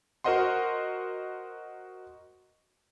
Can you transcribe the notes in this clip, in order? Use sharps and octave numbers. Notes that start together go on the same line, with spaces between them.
F#4 A#4 C5 D#5 F#5 C6